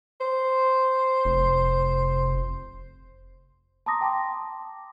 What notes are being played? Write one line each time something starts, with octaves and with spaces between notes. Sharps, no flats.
C5
F1
A5 A#5 C6 D6 D#6 A#6
G5 A5 C6 D6